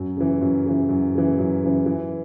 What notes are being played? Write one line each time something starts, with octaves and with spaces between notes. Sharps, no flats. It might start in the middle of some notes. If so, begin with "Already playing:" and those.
Already playing: F#2
C#3 E3
F#2
C#3 E3
F#2
C#3 E3
F#2
C#3 E3
E3